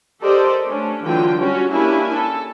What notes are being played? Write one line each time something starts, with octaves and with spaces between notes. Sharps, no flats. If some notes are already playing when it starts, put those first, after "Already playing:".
G4 A4 A#4 C5 D5 D#5
A3 C#4 D4
D3 E3 F#3 F4 G5
G3 C#4 F#4
A#3 C#4 D4 E4 G4 G#5
A4